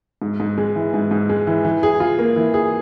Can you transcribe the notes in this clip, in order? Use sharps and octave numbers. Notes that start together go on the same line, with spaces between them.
G#2
G#2
G#3
E3
G#2
G#2
G#3
E3
E3
G#4
F4
A#3
E3
G#4